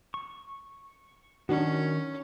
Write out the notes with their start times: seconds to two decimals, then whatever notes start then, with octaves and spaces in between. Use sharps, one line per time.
0.14 C#6
1.49 D#3 C#4 D4 F#4